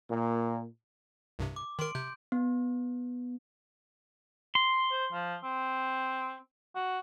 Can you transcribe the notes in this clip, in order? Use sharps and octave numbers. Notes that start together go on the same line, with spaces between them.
A#2
C2 G2 C3
D6
D#3 A#4 C6 D7
C3 G6
B3
C6
C5
F3
C4
F#4